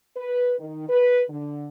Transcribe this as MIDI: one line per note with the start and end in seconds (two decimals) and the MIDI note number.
0.17 0.55 71
0.59 0.89 51
0.89 1.24 71
1.30 1.67 50